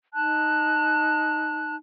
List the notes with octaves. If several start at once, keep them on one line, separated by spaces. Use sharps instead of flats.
D#4 A5 F#6